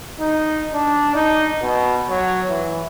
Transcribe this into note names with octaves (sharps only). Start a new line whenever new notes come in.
D#4
D4
D#4
B2
F#3
E3